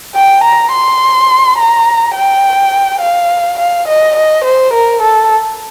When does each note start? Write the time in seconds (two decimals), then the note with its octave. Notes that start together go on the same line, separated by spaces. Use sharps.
0.15 G5
0.44 A#5
0.73 C6
1.59 A#5
2.16 G5
3.01 F5
3.59 F5
3.88 D#5
4.16 D#5
4.44 C5
4.74 A#4
5.02 A4